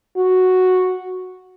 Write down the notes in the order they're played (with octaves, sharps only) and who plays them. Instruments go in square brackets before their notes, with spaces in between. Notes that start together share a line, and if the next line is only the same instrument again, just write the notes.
[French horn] F#4